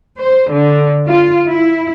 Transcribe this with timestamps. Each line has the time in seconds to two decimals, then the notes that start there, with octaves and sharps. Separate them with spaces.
0.20 C5
0.51 D3
1.08 F4
1.48 E4